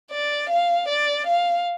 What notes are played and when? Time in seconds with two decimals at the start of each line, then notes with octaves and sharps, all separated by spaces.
0.11 D5
0.50 F5
0.88 D5
1.27 F5